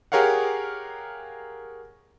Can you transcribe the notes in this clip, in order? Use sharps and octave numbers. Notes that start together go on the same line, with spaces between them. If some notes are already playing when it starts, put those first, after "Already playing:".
G4 G#4 A#4 C#5 F5 F#5